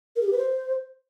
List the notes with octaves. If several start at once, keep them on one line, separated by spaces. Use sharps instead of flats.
A#4
G#4
G4
B4
C5